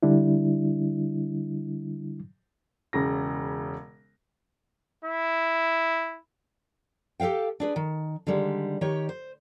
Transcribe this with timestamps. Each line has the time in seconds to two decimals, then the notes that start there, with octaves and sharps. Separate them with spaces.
0.03 D3 G3 D4 E4
2.93 E1 C#3 A#6
5.05 E4
7.20 G4 A4 C5 F5 G5
7.60 D4 G#4 B4
7.76 D#3
8.27 D3 D#3 G3 G#3
8.81 D#3 G4 C#5
9.09 C5